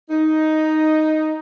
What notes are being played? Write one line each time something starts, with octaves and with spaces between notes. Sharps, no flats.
D#4